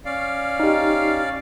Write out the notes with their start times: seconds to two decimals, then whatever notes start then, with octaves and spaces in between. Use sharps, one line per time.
0.05 C#4 D5 F5
0.60 D#4 G4